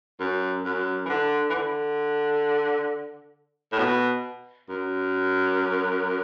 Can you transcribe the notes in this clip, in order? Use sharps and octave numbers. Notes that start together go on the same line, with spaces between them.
F#2
F#2
E3
D3
E3
D3
A2
B2
F#2